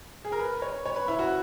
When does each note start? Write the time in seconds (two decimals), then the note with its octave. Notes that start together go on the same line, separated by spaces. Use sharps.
0.25 G#4
0.32 A#4
0.40 B4
0.62 C#5
0.86 C#5
0.96 B4
1.08 E4
1.19 F#4